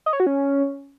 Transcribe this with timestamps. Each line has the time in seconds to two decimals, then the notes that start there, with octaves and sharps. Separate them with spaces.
0.06 D#5
0.13 C#5
0.20 F#4
0.27 C#4